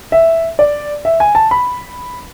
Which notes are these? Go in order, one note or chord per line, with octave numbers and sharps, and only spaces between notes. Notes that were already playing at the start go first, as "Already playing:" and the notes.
E5
D5
E5
G#5
A5
B5